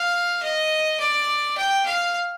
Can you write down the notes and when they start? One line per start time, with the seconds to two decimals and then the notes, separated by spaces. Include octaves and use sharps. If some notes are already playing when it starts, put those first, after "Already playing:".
Already playing: F5
0.43 D#5
1.00 D5
1.57 G5
1.86 F5